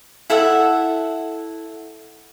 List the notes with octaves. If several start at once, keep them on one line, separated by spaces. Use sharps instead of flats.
E4 A4 E5 F#5